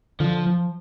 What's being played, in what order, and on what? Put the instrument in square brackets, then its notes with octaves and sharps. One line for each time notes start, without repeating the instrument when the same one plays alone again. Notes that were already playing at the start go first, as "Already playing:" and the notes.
[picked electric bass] D3 [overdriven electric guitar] F3
[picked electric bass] F3